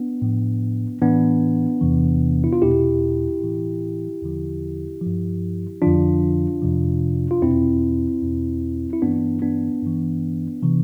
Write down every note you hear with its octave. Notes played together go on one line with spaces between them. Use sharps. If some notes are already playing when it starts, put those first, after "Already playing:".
Already playing: B3 D4
A2 F3
A2 E3 B3 D4
E2 C3 E3
E4
F4
E2 B2 E4 G4
A2 E3
E2 D3 F3
G2 F3
F2 D3 F3 D4 F4
F2 C3 F3
F4
E2 B2 C4 E4
E2 B2
E4
G2 E3 B3 D4
B3 D4
G2 E3
C3 E3